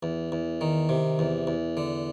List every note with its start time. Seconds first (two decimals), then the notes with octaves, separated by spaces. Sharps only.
0.03 E2
0.32 E2
0.61 D#3
0.89 C3
1.19 E2
1.47 E2
1.77 D3